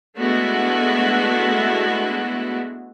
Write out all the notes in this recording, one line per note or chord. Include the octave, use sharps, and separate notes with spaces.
G#3 A3 B3 D4 E4 F#4